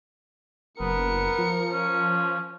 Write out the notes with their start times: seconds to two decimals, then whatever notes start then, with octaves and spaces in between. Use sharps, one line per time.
0.80 F#1 B3 A#4 C#7
1.38 F3
1.72 C#4